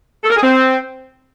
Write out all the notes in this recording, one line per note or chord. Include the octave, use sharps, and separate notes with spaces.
A4
A#4
G#4
C4